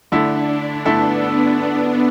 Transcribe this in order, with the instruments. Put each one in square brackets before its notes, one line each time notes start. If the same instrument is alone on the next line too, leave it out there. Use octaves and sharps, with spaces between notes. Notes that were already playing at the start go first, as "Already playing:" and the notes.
[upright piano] D3 A3 E4 A4 [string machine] D4
[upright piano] D3 A3 E4 A4 [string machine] B3